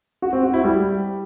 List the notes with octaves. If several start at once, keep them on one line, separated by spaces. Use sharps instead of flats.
F#4
C4
F#4
E4
G3